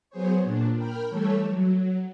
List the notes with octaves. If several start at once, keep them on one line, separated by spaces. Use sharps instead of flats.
F#3 B3 G#4 C5 C#5
A#2 D4
A#4 G5 B5 F6
E3 G3 A3 A4 C#5
F#3